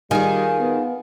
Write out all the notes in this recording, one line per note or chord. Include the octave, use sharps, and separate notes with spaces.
D#3 G3 F4 G#4 G#5
B3